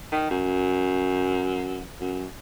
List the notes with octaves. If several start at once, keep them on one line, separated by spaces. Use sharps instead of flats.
D#3
F#2
F#2